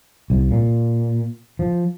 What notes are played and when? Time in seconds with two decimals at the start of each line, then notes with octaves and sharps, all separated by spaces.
0.30 C2
0.51 A#2
1.59 F3